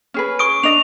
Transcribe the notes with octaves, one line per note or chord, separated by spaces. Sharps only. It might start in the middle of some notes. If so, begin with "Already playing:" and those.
C#4 G#4 B4
C#6 D#6 D7
D4 D#5 F7